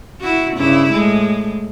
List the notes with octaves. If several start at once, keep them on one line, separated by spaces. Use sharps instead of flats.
E4 F#4
G2 C#3 E4
A2 G#3